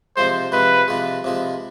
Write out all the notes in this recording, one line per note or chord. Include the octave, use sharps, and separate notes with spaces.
C3 F3 G#3 C5
C3 F3 G#3 B4
C3 F3 G#3
C3 F3 G#3